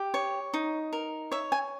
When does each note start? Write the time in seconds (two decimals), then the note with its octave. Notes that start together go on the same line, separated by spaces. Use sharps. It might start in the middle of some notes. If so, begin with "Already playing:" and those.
Already playing: G4
0.14 C#5
0.54 D#4
0.93 A#4
1.32 C#5 E5
1.52 G#5